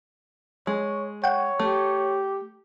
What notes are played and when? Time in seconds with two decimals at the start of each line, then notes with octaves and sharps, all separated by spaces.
0.67 G#3 C#5
1.24 C#5 F#5 G5
1.60 A3 G4